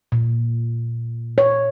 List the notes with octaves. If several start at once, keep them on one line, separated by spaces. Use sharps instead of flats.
A#2
C#5